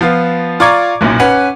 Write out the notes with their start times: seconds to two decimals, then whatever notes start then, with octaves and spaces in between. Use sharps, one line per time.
0.01 F3 B3 F4
0.60 F4 D5 A#5 C#6 D6 G#6
1.01 F#1 B1 F#2 A#2
1.20 C#4 B4 F#5